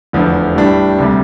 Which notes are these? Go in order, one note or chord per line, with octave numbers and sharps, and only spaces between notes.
F1 E2 D3 F3
A2 G3 D4 G4
D2 C3 G3